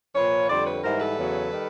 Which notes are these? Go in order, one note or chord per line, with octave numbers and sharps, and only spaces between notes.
A#2 F3 B4 C#5
F2 D3 G3 C5 D5
B4 C#5
G#2 E3 G3 A#4 C5
A4 B4
E2 C#3 F#3
D#3 G3